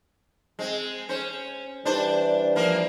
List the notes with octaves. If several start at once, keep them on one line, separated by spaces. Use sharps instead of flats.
G#3 C4
C#4 C5
E3 G3 D4 C5
F3 A#3 C5